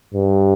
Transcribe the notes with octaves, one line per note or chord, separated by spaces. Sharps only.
G2